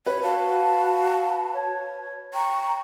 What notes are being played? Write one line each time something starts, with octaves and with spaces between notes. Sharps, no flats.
B4 C#5
F#4 F5 A5
C#5
G5 A#5 C#6